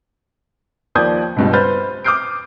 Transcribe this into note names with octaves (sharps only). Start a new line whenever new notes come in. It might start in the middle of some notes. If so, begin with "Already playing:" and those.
D#2 F3 D5 D#6 G6 G#6
C#2 G2 B2
B4 C5 F6 G6 A6
D6 D#6 F6 G6 C7 D7